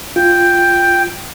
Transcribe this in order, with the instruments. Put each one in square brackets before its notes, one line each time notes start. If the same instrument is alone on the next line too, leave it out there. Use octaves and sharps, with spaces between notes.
[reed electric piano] F4 [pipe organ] G5